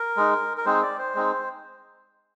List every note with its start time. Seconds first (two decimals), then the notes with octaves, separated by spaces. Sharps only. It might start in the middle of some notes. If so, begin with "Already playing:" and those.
Already playing: A#4
0.17 G#3 D#4
0.57 A#4
0.65 G#3 C4 D#4 C5
0.82 D5
0.99 C5
1.15 G#3 C4 D#4